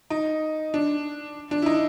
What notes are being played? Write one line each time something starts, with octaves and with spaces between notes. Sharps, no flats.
D#4
D4
D4
E4
D#4